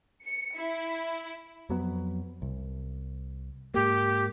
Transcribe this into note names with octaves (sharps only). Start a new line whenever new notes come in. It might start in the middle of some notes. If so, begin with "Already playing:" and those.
C#7
E4
F2 F#3 B3
C2
G#2 A#3 G4